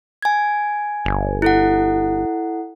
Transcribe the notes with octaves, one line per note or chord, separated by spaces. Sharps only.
G#5 G#6
G1
E4 A4 F#5